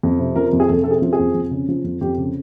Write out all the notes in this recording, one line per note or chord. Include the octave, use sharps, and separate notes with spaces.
F2
C3
F3 A#4
F2
G#4
F2 A4
C3 A4
G#4
F3
G#4
F2
F2
C#3
F3
F2
F2 G4
C#3